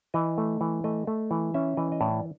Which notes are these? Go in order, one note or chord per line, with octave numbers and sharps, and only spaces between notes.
E3 D#5
A3
E3
A3 D#5
A3
E3
C#4 E5
E3 D#5
D#5
A2 D5